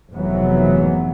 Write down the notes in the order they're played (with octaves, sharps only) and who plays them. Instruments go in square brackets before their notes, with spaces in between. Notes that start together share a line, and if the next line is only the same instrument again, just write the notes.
[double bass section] F1 G#2 E3 F#3 B3